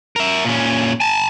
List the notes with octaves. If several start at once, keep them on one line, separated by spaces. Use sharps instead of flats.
A#4 E5
A#2 C#4
G#5 A5